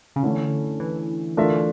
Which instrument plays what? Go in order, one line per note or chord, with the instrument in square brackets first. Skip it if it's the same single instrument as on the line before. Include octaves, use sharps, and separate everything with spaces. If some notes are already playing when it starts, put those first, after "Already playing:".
[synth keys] C#3
[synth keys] D3 [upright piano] E3 A3 C#4 E4
[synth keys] E3
[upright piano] A3 D4 F4 A#4 E5